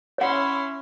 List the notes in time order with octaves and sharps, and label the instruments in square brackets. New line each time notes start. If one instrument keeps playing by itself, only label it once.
[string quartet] C#4 E4 C6 [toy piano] C#5 F#5